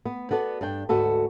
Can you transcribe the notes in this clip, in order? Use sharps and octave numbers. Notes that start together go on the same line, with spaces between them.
B3
B3 F#4 A4 D5
G2 D4 G5
D2 G#2 F#4 A4 B4